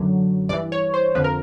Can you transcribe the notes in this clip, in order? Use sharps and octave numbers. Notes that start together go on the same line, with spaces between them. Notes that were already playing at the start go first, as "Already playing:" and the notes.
Already playing: F#2 D3 F#3
G2 E3 D5
C#5
C5
F2 D3 F3 B4
A#4